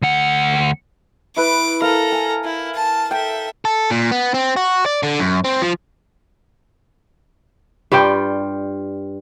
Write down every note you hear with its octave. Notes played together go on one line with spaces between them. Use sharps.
D2 F#5
E4 B4 D6
A4 A#4 F5 A#5
G#5
E4
A5
A4 E5 G5
A4
A#2
B3
C4
F#4
D5
D3
F#2
C4
F3
G2 G3 F4 G5